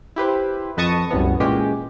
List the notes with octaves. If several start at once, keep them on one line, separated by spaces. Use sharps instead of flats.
E4 G4 B4 C5
F2 B4 D#5 A5 C#6 D#6
C2 F#2 A2 E3 B3
A#2 E3 G#3 C#4 G4